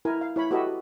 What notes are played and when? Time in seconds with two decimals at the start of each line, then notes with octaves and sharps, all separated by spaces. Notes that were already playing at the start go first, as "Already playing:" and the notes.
0.05 E4 A#4 G#5
0.21 F5
0.36 E4 C#5 B5
0.51 F#4 G4 A4 B4 D#5 E5